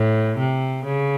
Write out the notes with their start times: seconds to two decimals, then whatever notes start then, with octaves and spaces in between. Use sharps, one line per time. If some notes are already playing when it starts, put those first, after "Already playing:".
Already playing: A2
0.38 C3
0.86 C#3